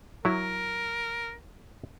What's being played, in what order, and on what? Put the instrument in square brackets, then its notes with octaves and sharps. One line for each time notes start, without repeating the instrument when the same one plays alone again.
[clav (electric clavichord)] F#3 E4 [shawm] A#4